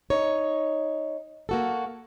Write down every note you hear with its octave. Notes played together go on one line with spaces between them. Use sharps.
D#4 C#5
A#3 F#4 A4